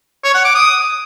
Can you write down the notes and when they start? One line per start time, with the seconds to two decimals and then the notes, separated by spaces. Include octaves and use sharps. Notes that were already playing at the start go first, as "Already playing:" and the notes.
0.24 C#5
0.34 F#5
0.45 D6
0.55 D#6